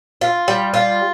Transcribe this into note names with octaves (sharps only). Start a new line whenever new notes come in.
F4
G3
F4